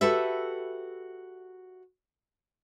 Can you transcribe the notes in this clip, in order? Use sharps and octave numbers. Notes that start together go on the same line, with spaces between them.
F#4 G4 A4 B4 E5